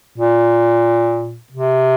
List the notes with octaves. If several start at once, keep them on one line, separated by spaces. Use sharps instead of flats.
A#2
C3